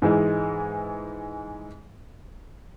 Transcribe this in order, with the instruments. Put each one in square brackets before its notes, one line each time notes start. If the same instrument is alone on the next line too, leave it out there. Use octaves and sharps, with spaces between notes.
[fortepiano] G#2 E3 G#3